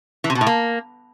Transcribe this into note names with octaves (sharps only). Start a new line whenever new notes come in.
E3
C3
B2
A2
A#3